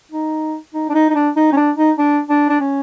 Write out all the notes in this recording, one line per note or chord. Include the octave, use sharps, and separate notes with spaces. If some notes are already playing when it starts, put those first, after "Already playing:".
D#4
D#4
D4
D#4
D#4
D4
D#4
C#4
D4
D#4
D4
D4
D4
C#4